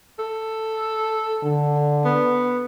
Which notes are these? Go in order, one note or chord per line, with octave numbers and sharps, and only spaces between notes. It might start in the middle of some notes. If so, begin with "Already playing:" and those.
A4
D3
B3